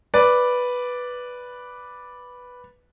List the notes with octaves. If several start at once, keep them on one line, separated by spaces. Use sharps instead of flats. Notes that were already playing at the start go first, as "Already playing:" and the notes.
B4 D5